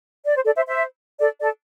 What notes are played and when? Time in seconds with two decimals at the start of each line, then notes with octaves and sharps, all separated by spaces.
0.25 D5
0.35 C5
0.45 A4 D5
0.56 C5 E5
0.67 C5 E5
1.19 A4 D5
1.41 A4 D5